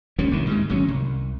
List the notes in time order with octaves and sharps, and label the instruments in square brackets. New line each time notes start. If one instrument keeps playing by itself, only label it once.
[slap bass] C#2 G3 A#3 C#4
C2 C3 D#3 E3
G#2 G3 G#3
G#1 D2 F#3 C#4
C2